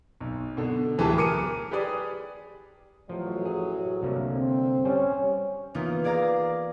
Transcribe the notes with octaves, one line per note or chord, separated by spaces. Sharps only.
B1
B2 D3
D1 E3 G4 G#4 A5
A#4 D6 C#7 D#7
G4 G#4 B4 D5 D#6
A1 F3 F#3
G#4
C2 D3 A#3
C4
G3 C#4 C5
E3 A#3 B3 D#4 F4
G#4 D5 F5 A#5